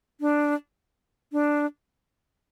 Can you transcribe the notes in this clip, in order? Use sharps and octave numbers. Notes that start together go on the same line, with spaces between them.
D4
D4